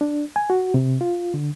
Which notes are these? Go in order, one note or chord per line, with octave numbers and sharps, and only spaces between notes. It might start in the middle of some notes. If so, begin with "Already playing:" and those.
D4
G#5
F#4
C3
F4
D3